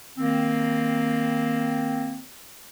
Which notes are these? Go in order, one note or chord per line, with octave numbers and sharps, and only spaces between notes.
D#3 A#3 C4